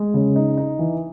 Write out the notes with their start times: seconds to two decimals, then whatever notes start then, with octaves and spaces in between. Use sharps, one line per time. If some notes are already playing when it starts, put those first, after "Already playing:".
Already playing: G#3
0.14 C#3
0.36 D#4
0.57 D#4
0.79 E3